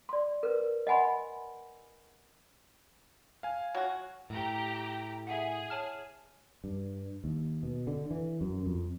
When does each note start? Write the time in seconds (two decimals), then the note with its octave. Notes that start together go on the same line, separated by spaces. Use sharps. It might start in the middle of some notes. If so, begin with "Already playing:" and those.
0.09 D5 C6
0.43 A#4 B4
0.87 D#5 F#5 G#5 B5 C6
3.43 F5 G#5
3.75 F#3 F#4
4.30 A2 G4 A#5
5.27 G#4 E5 F#5
5.70 C#5 A5 F6
6.64 G2
7.24 D#2
7.63 B2
7.87 D3
8.11 E3
8.41 F#2
8.66 F2